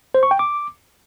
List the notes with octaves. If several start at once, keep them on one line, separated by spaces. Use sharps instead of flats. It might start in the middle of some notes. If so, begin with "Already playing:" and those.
C5
C#6
G5
D6